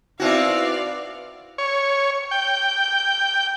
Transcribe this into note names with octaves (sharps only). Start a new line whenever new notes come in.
B3 C4 D#4 E4 F#4 D5 E5 F5
C#5
G5